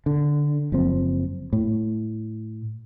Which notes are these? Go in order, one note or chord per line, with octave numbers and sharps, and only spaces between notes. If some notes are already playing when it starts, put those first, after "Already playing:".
D3
F#1 F3 C4
A2